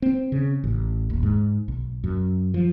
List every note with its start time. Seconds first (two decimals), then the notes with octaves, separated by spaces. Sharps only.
0.02 C4
0.32 C#3
0.64 A1
1.10 D#1
1.23 G#2
1.68 B1
2.04 F#2
2.54 F3